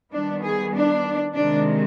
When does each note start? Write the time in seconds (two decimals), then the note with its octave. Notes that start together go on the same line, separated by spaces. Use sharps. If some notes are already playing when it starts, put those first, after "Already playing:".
0.12 D#3 G3 B3 D4
0.43 G#4
0.74 D4
1.34 C3 D#3 G#3 D4